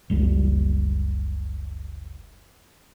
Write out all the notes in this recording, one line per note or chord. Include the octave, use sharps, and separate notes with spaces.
F#1 C#2 G3